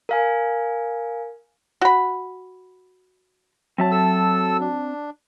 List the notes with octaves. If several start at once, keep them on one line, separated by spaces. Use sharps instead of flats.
A#4 F5 G#5
F#4 B5
F#3 C4 E5 A5
A4 E6
D4